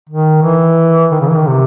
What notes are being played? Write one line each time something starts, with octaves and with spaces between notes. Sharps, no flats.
D#3
E3
D#3
C#3
E3
D#3
C3